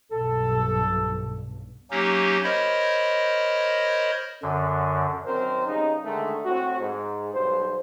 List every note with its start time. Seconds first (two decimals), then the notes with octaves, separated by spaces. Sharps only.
0.11 B1 G2 B2 A4
1.91 F#3 A#3 C#4 D#4 G4
2.43 A#4 C5 C#5 D#5 B5
4.43 F#2 D3
5.26 F#2 D#3 C4 A#4 C5
5.67 C#3 G3 D#4
6.05 D3 D#3 G#3 A3
6.45 A2 C4 F#4
6.79 G#2
7.33 B1 G2 C5